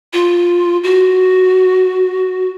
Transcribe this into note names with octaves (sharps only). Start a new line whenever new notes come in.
F4
F#4